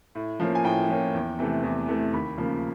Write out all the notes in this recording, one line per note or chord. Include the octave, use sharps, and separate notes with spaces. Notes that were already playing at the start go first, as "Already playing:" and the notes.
A2
F3 A#3 C#4
G#5
A2 G5
F3 A#3 C#4
E2
C3 E3 A3
E2
C3 E3 A3
D#2 B5
C#3 F3 A#3